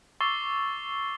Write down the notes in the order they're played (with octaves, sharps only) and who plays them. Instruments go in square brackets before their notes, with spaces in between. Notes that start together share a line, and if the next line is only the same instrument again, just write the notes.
[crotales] C#6 D6 E6 A6 C7 G7